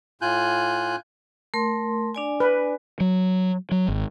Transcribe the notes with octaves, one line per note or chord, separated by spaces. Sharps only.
A2 F4 G#5 F#6 G6
A3 A#4 C6
D4 D5 G#5
B4
F#3
F#3
G#1